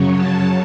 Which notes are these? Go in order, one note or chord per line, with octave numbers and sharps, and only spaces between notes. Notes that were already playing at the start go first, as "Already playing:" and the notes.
Already playing: F#2 C#3 F#3 C#4
A5